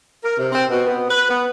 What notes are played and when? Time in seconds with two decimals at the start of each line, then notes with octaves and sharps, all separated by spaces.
0.23 A#4
0.37 C3
0.52 C4
0.70 B2
0.86 B3
1.09 B4
1.28 B3